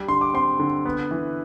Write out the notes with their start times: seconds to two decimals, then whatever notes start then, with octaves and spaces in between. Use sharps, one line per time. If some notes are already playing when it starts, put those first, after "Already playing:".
Already playing: G3 D4
0.08 D3 C6
0.21 D6
0.34 C4 C6
0.60 D3
0.85 B3
1.11 E3